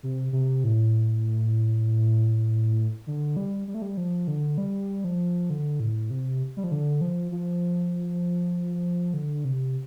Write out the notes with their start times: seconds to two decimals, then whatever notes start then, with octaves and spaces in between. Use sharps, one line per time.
0.03 C3
0.33 C3
0.64 A2
3.07 D3
3.37 G3
3.68 G3
3.74 A3
3.82 G3
3.97 F3
4.27 D3
4.58 G3
5.04 F3
5.50 D3
5.80 A2
6.10 C3
6.57 G3
6.64 F3
6.71 D3
7.01 F3
7.32 F3
9.14 D3
9.45 C3